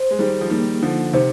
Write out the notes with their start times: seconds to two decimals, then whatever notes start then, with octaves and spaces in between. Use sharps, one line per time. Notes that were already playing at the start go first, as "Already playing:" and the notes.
Already playing: C5
0.11 G#3
0.19 D#3 G3 G#4
0.41 F3
0.50 D#3 G3 A#3
0.82 D3 F3 D#4
1.13 C3 D#3 C5